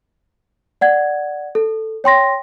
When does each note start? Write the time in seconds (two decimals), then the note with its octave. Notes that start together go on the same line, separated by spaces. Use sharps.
0.81 D5 F#5 G#6
1.55 A4
2.04 C#5 G5 C6 A#6